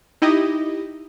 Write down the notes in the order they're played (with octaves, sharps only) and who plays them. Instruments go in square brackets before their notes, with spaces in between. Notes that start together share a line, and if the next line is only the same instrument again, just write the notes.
[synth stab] D#4 E4 G4 D#5